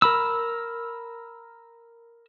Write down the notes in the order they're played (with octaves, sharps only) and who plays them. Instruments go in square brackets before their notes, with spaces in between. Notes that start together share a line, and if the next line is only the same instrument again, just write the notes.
[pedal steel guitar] A#4 B5 E6